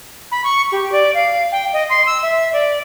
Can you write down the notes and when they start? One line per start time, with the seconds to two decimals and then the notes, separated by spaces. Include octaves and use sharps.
0.32 B5
0.44 C#6
0.72 G4
0.92 D5
1.14 F5
1.52 G5
1.73 D#5
1.90 C6
2.06 E6
2.22 E5
2.53 D5